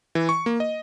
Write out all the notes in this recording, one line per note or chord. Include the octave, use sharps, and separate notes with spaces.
E3
C#6
A#3
D#5